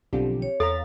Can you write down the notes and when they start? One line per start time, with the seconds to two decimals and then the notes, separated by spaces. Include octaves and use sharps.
0.13 B1 D3 F3 C4 G4
0.42 C#5
0.60 E2 A4 F5 A#5 A6 B6